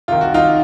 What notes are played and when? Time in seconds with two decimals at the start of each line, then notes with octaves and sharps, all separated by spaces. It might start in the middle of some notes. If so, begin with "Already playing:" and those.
0.08 C3 D#3 F4
0.21 F#4
0.34 D#4 F4